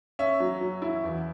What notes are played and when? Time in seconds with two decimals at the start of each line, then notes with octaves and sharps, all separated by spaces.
0.19 C#4 E5
0.40 F#3
0.61 F#3
0.82 E4
1.04 E2